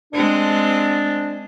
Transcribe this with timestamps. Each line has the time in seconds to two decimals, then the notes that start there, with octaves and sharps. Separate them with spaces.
0.13 G#3 C4 D4